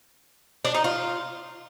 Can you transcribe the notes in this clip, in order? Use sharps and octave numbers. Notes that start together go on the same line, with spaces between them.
D4
D#4
F4